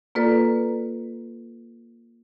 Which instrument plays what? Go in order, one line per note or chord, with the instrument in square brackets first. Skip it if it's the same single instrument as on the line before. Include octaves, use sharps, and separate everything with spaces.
[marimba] A#3 F4 A4 B4 D5 A#5